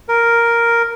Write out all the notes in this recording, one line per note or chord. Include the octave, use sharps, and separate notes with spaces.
A#4